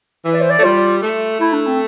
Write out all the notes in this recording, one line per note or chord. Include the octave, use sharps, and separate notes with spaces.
E3
D5
C5
D5
A3
G3 F4
A3
A3 E4
D4
C4